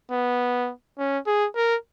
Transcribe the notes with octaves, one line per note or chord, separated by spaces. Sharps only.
B3
C#4
G#4
A#4